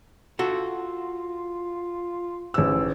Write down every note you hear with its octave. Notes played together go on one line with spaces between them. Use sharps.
F4 F#4 A4
A1 G#2 E6